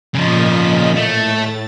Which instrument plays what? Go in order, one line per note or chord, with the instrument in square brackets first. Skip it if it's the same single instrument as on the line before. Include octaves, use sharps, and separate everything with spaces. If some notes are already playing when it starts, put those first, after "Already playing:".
[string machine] A#2 D#5 B6 [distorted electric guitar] C#3 F3
[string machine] A2 A6 [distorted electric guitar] A3